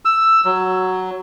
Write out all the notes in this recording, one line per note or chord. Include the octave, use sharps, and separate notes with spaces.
E6
F#3